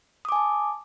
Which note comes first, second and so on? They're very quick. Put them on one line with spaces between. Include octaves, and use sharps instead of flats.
D#6 D6 G#5 A5